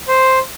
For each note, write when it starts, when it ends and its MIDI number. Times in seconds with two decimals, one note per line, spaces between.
0.08 0.39 72